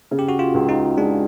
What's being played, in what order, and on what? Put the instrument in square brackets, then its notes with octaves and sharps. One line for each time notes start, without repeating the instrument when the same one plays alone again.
[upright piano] C#3
[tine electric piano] G4
F#4
F4
[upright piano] C#2
[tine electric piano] D#4
[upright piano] G#3 [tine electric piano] D4